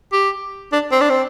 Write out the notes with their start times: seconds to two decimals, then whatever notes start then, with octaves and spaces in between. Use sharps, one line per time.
0.13 G4
0.73 D4
0.92 C4
1.01 D4
1.10 C4